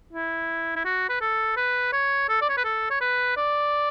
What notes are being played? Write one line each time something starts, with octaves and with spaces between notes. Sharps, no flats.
E4
E4
F#4
B4
A4
B4
C#5
A4
D5
C#5
B4
A4
C#5
B4
D5